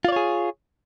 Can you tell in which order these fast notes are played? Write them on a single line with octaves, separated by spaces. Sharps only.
F4 D5 C#5 G#4